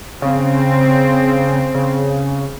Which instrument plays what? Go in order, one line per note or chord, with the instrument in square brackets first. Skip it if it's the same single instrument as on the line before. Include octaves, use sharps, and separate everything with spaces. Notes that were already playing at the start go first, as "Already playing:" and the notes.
[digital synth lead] C#3 [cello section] C4
[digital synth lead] C#3